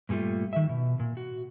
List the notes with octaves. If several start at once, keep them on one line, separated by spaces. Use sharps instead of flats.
G2 A#2 G3 A3 F4
D#3 E5
B2
A#2
F#4